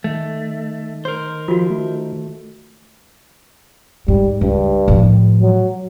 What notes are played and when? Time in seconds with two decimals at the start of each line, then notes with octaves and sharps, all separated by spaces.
0.04 D#3 A3
1.05 A#4 C5
1.48 F3 F4 F#4
1.70 A3
4.08 G#2 G3
4.41 C#2 G2
4.88 A2 F3
5.41 F#3